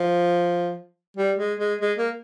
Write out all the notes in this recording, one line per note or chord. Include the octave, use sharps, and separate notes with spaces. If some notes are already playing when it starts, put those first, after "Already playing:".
Already playing: F3
G3
G#3
G#3
G#3
A#3